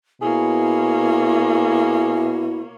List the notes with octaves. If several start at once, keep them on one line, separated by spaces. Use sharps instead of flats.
B2 A#3 E4 G#4 C#5